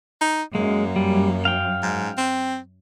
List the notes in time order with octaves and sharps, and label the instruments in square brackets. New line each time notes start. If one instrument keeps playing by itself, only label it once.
[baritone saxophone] D#4
[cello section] F#2 [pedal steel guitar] G#3 [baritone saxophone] A#3
[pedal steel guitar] G3
F5 G5
[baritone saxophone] G#2
C4